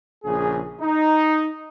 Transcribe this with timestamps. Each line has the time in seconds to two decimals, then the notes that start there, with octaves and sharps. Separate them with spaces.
0.24 A#1 C#3 G#4
0.81 D#4